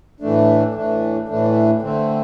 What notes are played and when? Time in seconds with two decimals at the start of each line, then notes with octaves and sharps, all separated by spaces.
0.20 A2 E3 A3 D4
0.74 A2 E3 A3 D4
1.28 A2 E3 A3 D4
1.82 D3 A3 C4